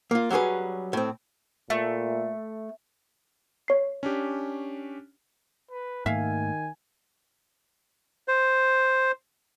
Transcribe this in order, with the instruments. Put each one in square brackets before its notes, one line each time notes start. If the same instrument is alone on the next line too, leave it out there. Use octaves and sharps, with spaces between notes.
[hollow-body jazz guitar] A#3 F4
F#3 G3 C#4 G#4 B4
A2 C4
[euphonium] A#2 [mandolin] A3
[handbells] C#5 C7
[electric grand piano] C#4 D4 G4
[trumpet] B4
[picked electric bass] G#2 A3 A#3 [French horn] D#3 [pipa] E5 F5 [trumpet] G#5
[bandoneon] C5